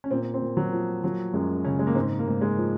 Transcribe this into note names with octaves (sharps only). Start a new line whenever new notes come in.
C#4
A#2 C4
C4
A#2
F#3
F3
F3 F#3
F#2 G#3
C#3 C#4
G#3
A#3
G#2 C4
A#3
G#2
G#3
F3